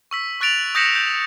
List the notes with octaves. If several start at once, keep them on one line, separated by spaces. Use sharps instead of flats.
C#6 E6 B6
C#6 F#6 A6 D7 F7 F#7
D#6 G6 A#6 B6 C#7 E7
G6